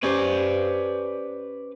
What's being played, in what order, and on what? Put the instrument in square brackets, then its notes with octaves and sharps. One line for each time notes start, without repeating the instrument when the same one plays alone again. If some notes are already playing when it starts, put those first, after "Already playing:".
[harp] C#4 G4 C5 [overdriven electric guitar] B4 D5